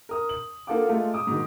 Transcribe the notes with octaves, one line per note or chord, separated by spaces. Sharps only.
A#4 D#6
F#7
A#3 F4 A4 F5 F#5 D6
G#3 A3 F4
D6 D#6
G#2 B2 D#3